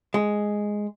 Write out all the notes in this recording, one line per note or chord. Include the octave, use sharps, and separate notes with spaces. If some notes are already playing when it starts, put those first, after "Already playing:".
G#3